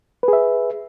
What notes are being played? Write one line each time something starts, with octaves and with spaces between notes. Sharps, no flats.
G#4 B4 E5